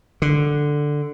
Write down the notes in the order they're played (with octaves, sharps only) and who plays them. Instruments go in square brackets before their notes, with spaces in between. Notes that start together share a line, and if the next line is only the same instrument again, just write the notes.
[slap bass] D3